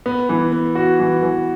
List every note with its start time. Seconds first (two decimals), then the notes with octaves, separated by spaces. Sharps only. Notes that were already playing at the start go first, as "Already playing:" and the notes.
0.06 B3
0.29 E3
0.52 B3
0.75 F#4
0.99 E3
1.23 E3